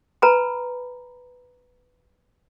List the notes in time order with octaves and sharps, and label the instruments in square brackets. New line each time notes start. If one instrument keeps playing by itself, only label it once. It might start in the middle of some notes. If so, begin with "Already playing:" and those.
[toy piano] B4 G#5 A#5 B5